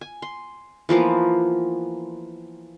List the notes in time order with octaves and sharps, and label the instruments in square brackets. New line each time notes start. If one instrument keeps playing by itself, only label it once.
[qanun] G#5
C6
E3 F3 A#3 B3